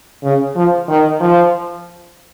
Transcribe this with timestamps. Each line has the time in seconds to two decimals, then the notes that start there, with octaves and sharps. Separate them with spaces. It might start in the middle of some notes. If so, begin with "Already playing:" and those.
0.24 C#3
0.56 F3
0.89 D#3
1.20 F3